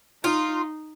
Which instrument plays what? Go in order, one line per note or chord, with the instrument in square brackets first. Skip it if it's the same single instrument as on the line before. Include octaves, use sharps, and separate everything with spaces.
[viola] D#4 [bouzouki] F4